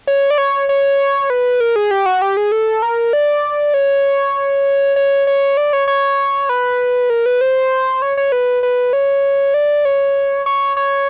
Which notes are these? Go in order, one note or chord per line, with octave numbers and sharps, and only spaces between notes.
C#5
D5
C#5
C#5
B4
A#4
G#4
G4
F#4
G4
G#4
A4
A#4
D5
C#5
C#5
C#5
D5
C#5
C#5
B4
A#4
B4
C5
C#5
C#5
B4
B4
C#5
D5
C#5
C#5
C#5